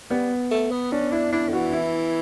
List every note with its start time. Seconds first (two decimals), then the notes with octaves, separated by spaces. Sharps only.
0.10 G3 B3
0.52 A3
0.72 B3
0.92 C#4 D4
1.12 D4 E4
1.33 D4 E4
1.49 D3
1.53 E3 F#4
1.73 E4